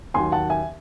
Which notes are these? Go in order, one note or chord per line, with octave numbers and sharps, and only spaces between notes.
D#2 D#3 F#3 G#5 C6
F#5 A5
E5 G#5